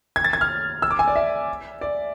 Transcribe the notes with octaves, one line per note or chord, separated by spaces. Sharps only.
G#6
A6
G#6
F6
E6
D6
G#5
D5
E5
D5